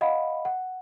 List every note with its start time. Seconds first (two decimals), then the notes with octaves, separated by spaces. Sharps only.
0.01 D#5 F5 F#5 B5
0.45 F#5